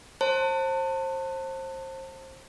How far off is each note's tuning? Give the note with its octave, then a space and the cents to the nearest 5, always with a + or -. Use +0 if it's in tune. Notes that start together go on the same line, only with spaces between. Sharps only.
C5 +25 A5 +30